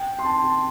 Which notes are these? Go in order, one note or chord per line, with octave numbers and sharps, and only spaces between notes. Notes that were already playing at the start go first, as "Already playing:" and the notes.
Already playing: G5
C6
A5
A5